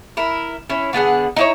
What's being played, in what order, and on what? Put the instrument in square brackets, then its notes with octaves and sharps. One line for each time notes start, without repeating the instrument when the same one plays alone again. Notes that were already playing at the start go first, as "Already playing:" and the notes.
[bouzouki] E4 A#4
C#4 E4
D3 B3 G#4 F#5
D#4 E4 C#5